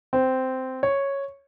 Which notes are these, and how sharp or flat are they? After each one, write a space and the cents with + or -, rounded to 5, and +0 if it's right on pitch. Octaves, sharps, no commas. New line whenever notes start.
C4 -10
C#5 -5